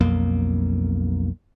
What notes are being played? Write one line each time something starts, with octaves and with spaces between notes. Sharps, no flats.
B1 F2 A#3